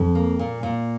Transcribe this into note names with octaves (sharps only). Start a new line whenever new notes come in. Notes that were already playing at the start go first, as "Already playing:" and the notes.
Already playing: F2
A#3
A#2
A#2